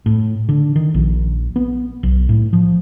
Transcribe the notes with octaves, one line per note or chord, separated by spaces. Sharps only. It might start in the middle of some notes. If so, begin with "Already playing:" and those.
A2
D3
D#3
A#1
B3
B1
A2
F3